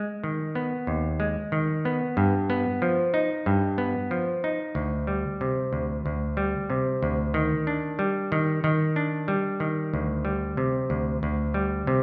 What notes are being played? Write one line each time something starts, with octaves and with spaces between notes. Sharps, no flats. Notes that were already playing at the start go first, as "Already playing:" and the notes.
Already playing: G#3
D#3
B3
D#2
G#3
D#3
B3
G2
B3
F3
D#4
G2
B3
F3
D#4
D2
G3
C3
D2
D2
G3
C3
D2
D#3
D4
G3
D#3
D#3
D4
G3
D#3
D2
G3
C3
D2
D2
G3
C3